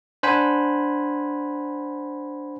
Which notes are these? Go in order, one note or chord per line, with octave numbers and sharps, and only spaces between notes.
D4 C5 F#5 G#5 B5